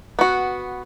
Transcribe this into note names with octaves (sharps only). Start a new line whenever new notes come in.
B3 F#4